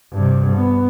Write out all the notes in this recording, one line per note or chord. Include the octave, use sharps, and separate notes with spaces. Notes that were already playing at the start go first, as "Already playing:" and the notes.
G2 C3
B3